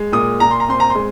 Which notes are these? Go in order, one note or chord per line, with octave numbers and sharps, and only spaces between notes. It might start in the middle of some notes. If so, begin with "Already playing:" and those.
Already playing: G#3
A#2 D#6
A#2 A#5
C6
A#5
C4 C6
A#5
C6
G#3